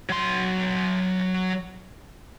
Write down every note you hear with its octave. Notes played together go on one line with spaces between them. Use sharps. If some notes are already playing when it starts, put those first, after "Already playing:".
F#3 C6